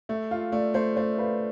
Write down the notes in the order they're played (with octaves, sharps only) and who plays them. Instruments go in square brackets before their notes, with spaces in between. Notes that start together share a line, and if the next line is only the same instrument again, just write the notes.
[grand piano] A3 [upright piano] E5
[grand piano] F4 [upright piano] F5
[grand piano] A3 [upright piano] D5
[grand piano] A3 [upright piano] C5
[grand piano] A3 [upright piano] C5
[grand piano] F4 [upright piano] B4